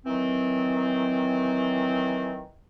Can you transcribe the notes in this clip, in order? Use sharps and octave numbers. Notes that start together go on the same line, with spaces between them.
D#3 E3 F#3 C4